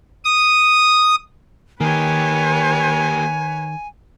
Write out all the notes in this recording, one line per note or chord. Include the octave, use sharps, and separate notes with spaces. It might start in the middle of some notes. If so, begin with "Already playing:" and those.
D#6
D#3 A#3 G4 B4 C#5 G#5